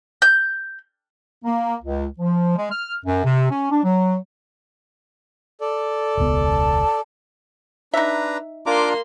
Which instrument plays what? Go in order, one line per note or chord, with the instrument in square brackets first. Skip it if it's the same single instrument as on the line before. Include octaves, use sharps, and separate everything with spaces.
[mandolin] G6
[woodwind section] A#3
C#2
F3
G#3
F6
F#2
C3
C#4
D4
F#3
[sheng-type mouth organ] A4 D5
[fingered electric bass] E1 C#2 B3
[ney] A5
[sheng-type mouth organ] D4 B4 A#5 [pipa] D#4 E5
[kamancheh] A#3 C6 [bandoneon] D4 F4 A#5 [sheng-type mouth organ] D6